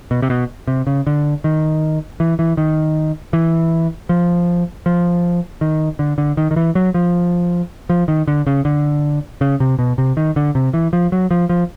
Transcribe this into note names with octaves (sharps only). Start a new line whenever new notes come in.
B2
C3
B2
C3
C#3
D3
D#3
E3
E3
D#3
E3
F3
F3
D#3
D3
D3
D#3
D#3
E3
F#3
F3
F3
D#3
D3
C#3
D3
C#3
C3
B2
C3
D#3
D3
C3
E3
F3
F#3
F3
F3